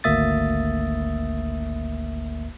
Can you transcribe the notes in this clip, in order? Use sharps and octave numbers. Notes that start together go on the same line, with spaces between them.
G#1 D2 A#3 E5 D#6 A6